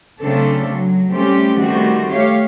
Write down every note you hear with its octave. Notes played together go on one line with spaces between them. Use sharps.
C#3 F#3 A3 C4 D4 A4
F#3
G3 A3 C4 C#4 G4
D#3 G3 A3 C4 F#4
A3 G4 C#5 F5